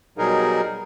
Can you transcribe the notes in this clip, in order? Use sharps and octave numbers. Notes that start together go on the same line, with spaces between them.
B2 F#3 G3 D#4 G#4 A#4